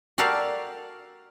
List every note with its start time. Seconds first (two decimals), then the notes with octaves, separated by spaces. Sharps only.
0.18 F#4 G4 A4 A#4 D5 F5